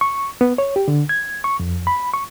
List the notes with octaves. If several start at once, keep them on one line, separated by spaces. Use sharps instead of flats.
C#6
B3
C#5
G4
D3
G#6
C#6
F2
B5
C#6